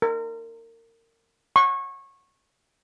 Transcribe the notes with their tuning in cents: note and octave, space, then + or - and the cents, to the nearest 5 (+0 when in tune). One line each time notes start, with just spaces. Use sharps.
A#4 -30
C#6 -20